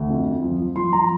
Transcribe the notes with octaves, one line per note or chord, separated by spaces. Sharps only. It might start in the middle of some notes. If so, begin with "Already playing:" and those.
Already playing: D2
F2
F2
F3
F3
F3 C6
F3 A#5